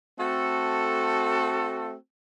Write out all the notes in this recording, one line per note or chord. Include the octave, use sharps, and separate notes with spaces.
A3 C4 F#4 A4